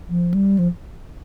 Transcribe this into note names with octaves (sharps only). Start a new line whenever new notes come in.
F3
G3
F3